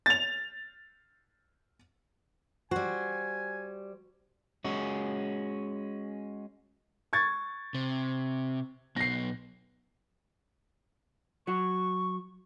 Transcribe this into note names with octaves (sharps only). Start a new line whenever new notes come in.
A6 F7
G3 F#4 C5 G#5
G#3 C#4 F#4
C#6 G#6 A6
C3
B1 B2 A#6 C7
F#3 F#4 C#6